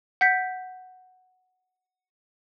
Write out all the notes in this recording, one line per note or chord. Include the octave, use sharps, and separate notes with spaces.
F#5 G6 B6